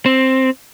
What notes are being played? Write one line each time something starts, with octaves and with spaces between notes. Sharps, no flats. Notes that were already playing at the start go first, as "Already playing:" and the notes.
C4